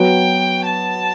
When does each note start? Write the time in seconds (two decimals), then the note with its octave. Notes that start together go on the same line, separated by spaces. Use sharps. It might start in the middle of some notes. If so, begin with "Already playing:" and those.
Already playing: F#3 B3 F#4 G5
0.62 A5